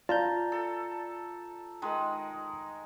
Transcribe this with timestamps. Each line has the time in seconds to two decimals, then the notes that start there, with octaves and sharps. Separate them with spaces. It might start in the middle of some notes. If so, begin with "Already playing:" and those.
0.09 F4 D5 A5 A#5 G6
0.52 A4
1.82 D#3 G#3